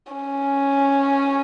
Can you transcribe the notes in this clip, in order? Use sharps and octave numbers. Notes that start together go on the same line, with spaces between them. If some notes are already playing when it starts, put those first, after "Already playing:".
C#4